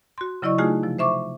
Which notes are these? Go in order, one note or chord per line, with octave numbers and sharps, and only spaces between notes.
F#4 C6
C#3 F#3 E4 D5 D#5 C#6
A3 D#4 F4 F#4 G#4 G#5
C3 F3
C5 E5 C#6 D6